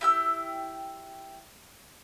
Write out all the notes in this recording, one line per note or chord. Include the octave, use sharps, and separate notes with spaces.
E4 G4 E6